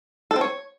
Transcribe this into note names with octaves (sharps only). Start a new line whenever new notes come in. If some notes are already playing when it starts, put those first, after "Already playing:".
A4
C4
C#5